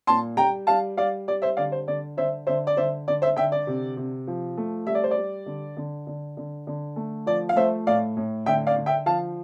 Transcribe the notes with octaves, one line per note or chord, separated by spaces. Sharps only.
A#2 A5 C6
G3 G5 A#5
G3 F5 A5
G3 D5 F5
G3 D5
C5 E5
D3 D5 F5
C5
D3 D5
D3 C5 E5
D3 C5 E5
D5
D3 C5 E5
D3 D5
C5 E5
D3 E5 G5
D5
C3
C3
F3
A3
G3 E5
D5
C5
D5
G3
D3
D3
D3
D3
D3
A3
F3 D5
F5
A3 C5 E5
A2 D5 F5
A2
D3 E5 G5
D5 F5
D3
E5 G5
F3 F5 A5